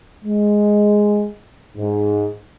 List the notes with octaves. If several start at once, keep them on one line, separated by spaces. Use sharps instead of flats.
G#3
G#2